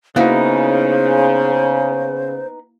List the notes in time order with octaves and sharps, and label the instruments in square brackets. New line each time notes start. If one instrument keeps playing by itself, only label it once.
[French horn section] C#3 [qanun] A#3 E4 F#4 [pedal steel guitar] B3 D#4 [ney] C5